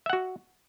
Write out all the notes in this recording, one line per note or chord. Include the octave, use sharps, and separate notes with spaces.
F#4 E5 F#5